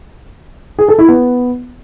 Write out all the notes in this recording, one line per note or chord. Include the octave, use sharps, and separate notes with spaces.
G#4
A4
E4
B3